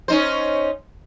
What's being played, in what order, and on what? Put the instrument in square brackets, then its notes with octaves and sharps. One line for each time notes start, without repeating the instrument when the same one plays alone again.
[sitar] C#4 D#4 C5